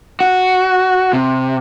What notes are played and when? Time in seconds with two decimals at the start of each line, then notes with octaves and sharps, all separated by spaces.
0.20 F#4
1.13 C3